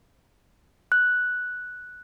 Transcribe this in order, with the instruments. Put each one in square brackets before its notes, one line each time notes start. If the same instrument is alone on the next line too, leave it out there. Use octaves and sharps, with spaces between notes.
[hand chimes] F#6